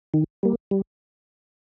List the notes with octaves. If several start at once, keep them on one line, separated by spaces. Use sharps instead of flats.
D#3
G3 A#3
G3